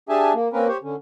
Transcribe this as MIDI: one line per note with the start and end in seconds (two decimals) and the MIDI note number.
0.09 0.33 62
0.09 0.33 67
0.09 0.33 68
0.09 0.33 76
0.09 0.33 80
0.09 0.33 81
0.34 0.48 58
0.53 0.68 58
0.53 0.68 60
0.53 0.68 61
0.53 0.68 70
0.53 0.68 71
0.68 0.77 67
0.68 0.77 72
0.68 0.77 73
0.83 0.96 50
0.83 0.96 61